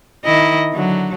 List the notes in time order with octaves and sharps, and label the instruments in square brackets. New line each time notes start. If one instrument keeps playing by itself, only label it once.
[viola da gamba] D#3 E4 D#5
D3 F#3